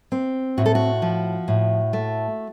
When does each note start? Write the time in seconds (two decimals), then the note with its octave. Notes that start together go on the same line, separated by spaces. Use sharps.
0.12 C4
0.58 A2 F#4
0.66 A4
0.75 F#4
1.02 F3
1.48 A2
1.93 A3